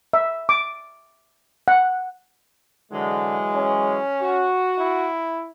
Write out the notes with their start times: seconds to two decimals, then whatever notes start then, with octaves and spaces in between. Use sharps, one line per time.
0.13 E5
0.49 D6
1.68 F#5
2.92 D3 E3 F#3 G#3
3.55 C#4
4.22 F#4
4.79 E4